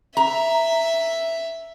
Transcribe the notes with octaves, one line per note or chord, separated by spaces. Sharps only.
E5 A#5